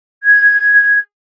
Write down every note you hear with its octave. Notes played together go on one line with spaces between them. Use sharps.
G#6